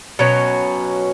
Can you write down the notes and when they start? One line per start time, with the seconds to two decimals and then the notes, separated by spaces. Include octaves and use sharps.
0.19 B2 F#3 C#4